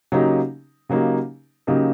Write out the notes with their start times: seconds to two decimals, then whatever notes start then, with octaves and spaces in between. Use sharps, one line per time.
0.12 C#3 F#3 A#3 D#4 G4
0.89 C#3 F#3 A#3 D#4 G4
1.67 C#3 F#3 A#3 D#4 G4